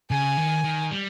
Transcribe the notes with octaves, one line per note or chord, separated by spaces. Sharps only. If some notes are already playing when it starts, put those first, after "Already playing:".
C#3 G#5
D#3
D#3
G3